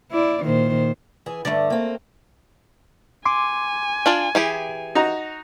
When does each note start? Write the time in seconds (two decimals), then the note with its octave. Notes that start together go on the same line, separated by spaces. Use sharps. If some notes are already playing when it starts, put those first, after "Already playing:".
0.12 E4 D5
0.44 A#2 D#3 C5
1.26 E3 G#4
1.45 G2 D3 A3 D5
1.70 A#3 C4
3.26 G#5 C6 D6
4.06 D4 F4 D5
4.35 E3 G4 G#4
4.95 D#4 F#4 A#5